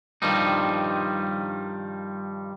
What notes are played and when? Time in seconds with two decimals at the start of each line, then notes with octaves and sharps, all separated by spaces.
0.22 G2 D#3 F3 G3 D#4